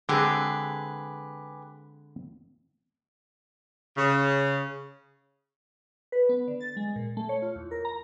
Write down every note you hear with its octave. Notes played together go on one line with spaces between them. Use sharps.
D3 G#3 C4 G4 G#4 B4
C#3
B4
B3
D3
A6
G#3
A#2
A3
C#5
F4
E2
A#4
A#5